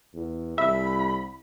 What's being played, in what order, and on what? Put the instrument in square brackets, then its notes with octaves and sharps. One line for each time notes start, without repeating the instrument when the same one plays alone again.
[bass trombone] E2
[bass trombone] C2 [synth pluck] E5 [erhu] B5